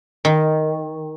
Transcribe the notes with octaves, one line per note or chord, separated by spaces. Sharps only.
D#3